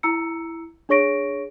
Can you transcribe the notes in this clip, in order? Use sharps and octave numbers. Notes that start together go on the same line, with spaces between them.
E4 A#5 E6 C#7
D4 G#4 C#5 C#6 A#6 D7